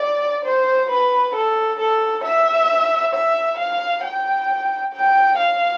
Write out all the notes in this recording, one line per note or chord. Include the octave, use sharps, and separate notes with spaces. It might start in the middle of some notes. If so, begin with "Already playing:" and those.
Already playing: D5
C5
B4
A4
A4
E5
E5
F5
G5
G5
F5